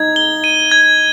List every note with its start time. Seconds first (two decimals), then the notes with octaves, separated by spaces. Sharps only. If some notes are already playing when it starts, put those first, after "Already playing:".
Already playing: D#4 G#6
0.16 G7
0.44 D#7
0.71 G#6